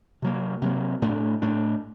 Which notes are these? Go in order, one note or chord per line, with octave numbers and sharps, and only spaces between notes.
C3 F#3 A#3
C3 F#3 A#3
A2 A3 D4
A2 A3 D4